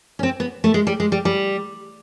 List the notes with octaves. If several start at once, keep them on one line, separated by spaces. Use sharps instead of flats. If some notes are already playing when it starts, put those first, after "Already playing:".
C#4
C4
B3
A3
G#3
G3
G#3
G3
G3